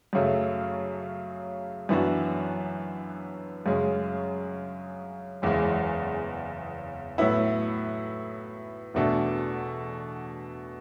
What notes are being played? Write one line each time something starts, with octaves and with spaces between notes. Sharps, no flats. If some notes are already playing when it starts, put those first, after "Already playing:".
F#2 C#3 F#3 A3
F#2 E3 B3 D4 F#4
F#2 C#3 G#3 C#4
F#1 E2 C#3 E3 G#3
A2 F#3 B3 E4
E2 B2 A3 D4 A4